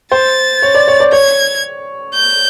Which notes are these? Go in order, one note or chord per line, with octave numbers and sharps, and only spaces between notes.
C5 A6
C#5
D5
C#5
D5
C#5 G#6
G6